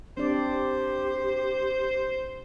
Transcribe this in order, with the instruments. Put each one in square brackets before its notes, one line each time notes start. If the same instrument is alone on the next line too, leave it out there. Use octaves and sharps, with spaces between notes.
[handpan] C4 D4 D5 [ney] G4 [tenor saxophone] C5